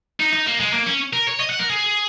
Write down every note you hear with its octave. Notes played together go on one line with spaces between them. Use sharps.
D#4
D#4
A#3
G#3
A#3
C#4
A#4
C#5
D#5
F#5
A#4
G#4